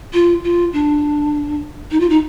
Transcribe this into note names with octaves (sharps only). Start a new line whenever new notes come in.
F4
F4
D4
D#4
F4
D#4